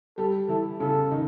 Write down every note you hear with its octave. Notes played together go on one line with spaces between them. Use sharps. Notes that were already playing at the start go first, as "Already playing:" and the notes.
G3 G4 A4
E3 E4 A4
C#3 C#4 A4
D#3 D#4